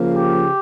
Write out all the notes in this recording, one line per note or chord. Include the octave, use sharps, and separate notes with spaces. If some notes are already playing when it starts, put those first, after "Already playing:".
Already playing: C#3 F3 A#3
G4